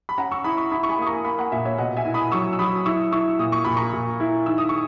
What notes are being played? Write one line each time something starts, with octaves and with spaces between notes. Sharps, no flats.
B5
C#4 F#5 A#5
C#6 E6
E4 B5 D#6
C#6 E6
E4 B5 D#6
C#6
G#5 B5
A#3 D#6
A#5 C#6
A#3 G#5 B5
F#5 A#5
A#2 E5 G#5
C#5 E5
B2 D#5 F#5
E5 G#5
E4
B5 D#6
F#3 C#6 E6
E6
F#3 B5 D#6
E4 C#6 E6
E4 C#6 E6
A#2 D#6
C#6
A#2 B5
A#5 C#6
A#2
E4
D#3 E6
D#6
C#6 E6